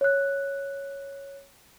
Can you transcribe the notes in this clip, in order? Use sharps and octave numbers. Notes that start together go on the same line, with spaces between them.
C#5 F#6